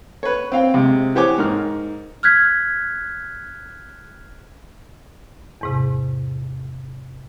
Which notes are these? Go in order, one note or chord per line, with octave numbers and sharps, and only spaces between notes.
B4 C#5
C4 F5 G5
C3 G#3
E3 G4 C5 C#5 G#5 D6
G#2 A#4 F6
F6 F#6 G#6 B6
E2 G#2 C3